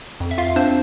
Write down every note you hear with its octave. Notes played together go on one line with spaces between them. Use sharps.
F2
E5
F4 F5
C4 D4 C5